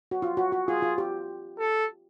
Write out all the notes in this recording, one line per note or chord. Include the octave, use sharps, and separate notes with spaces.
F#4
F4
F#4
F#4
F4 G#4
F4
G4
A4